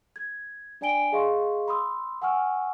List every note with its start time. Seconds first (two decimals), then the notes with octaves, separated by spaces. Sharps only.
0.16 G#6
0.81 D4 D5 G5 G#5 D7 G7
1.12 G#4 D#5 F5 C6 C#6
1.68 B5 C6 D#6 E6
2.22 F#5 G#5 C#6 E6 F6